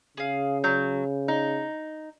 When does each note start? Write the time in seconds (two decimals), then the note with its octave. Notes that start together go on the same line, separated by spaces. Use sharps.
0.17 C#3 G#4 F5
0.64 F#3 G6
1.28 D#4